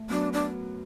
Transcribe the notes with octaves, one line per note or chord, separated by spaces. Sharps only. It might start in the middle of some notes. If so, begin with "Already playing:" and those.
Already playing: A3
F#2 F#3 B3 D4
D4